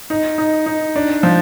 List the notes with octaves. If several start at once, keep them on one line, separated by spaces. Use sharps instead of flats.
D#4
D#4
D#4
D4
F3